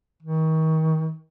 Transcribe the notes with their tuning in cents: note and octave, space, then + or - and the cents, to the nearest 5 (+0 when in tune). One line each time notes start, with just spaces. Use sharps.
D#3 +35